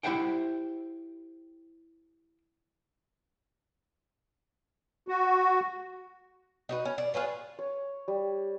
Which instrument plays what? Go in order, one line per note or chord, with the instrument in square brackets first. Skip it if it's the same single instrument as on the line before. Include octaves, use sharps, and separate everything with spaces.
[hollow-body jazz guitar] E4 G4 C5 E5 F#5 G5
[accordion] F#4
[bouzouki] D#4 F#4 B4
C#4
D5
F4 G#4 B4 C#5
[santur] C#5
G3